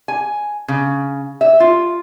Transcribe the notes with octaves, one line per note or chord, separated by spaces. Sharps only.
G#5
C#3
E5
F4